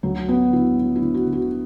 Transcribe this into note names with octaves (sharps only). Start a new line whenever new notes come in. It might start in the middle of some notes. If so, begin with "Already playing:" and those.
D2 F#3
F#3 B3
D3 E4
F#3
E4
D3
F#4
D3
F#4